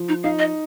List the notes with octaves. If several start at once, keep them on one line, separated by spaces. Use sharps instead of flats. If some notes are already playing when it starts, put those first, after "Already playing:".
Already playing: F3
D#4
D#4 F5
D#5